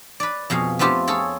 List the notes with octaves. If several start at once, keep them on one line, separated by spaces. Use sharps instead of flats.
B4 D5
F2 B2 G#4 F5
A3 B3 C4 F4 G4
F4 G#4 A4 C#5